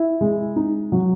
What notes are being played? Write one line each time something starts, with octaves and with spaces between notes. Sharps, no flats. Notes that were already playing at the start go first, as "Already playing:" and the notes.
Already playing: E4
G#3
D#4
F#3